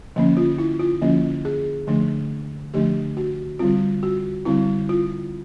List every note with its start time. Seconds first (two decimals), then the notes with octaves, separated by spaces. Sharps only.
0.16 D3 F3 A#3 C#4
0.37 F4
0.58 E4
0.80 F4
1.02 D3 F3 A#3 C#4
1.45 G#4
1.87 D3 F3 A3 D4
2.74 D3 F3 A3 D4 G4
3.17 F#4
3.59 D3 G3 C4 F4
4.03 F#4
4.45 D3 G3 C4 E4
4.89 F4